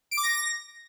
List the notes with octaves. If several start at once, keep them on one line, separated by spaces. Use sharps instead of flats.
D7
D6
A#6